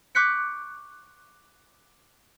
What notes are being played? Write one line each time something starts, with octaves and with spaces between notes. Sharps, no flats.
C#6 D6 F#6 G6 B6 C#7